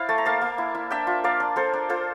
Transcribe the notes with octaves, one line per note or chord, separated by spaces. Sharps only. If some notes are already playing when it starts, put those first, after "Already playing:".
Already playing: E4 C5 D5 F5
A3 A5
A#5
A#3 F5 A5
A#3
E4
E4
D4 E5 G5
F4
A#3 D5 F5
D4
A#3 A4 C5
D4
F4 A4 C5